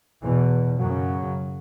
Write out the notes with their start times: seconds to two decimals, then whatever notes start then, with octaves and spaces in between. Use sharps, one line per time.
0.22 E2 B2 E3
0.79 F#2 C#3 F#3